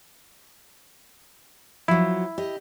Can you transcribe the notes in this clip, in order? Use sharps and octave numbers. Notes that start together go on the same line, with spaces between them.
F3 F#3 E4
G4 D#5